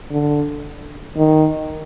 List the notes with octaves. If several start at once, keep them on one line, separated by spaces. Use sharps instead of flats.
D3
D#3